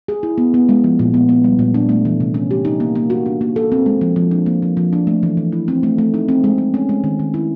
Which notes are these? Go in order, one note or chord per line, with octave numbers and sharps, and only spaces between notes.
G#4
E4
B3
B3
G#3
F3
A#2
B3
B3
G3
A#2
D4
A3
E3
C3
C#4
G4
D#4
A#3
A#3
F#4
D4
A#3
A4
C4
G#3
F3
F3
D4
A#3
F3
F3
D4
A3
E3
E3
E4
C4
A3
A3
D#4
C4
G#3
G#3
C#4
G#3
D#3
D#3
E4